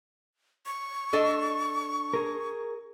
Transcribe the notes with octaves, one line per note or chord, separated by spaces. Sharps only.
C#6
D4 A4 D#5
G#4 A#4